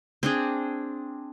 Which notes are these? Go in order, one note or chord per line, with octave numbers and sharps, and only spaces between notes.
C4 D4 G#4